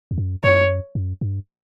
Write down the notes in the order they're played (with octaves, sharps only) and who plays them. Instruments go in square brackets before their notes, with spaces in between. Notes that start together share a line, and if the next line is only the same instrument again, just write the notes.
[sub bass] E2
F#2
[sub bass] F#2 [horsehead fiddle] C#5
[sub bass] F#2
G2